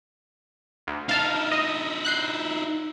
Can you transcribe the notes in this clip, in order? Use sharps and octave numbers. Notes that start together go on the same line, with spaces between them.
D2
D#4 E4 F5 A5 F6
D#5
F#6 G6 C7